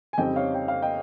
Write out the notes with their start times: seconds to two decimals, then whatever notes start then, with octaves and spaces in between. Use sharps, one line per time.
0.13 G#5
0.18 F2 C#3 G3 C4 D#4 D#5 G5
0.36 C#5 F5
0.54 G5
0.68 F5
0.82 D#5 G5